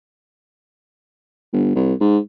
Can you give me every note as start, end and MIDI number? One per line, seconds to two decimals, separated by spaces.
1.53 1.75 31
1.76 1.94 36
2.01 2.18 44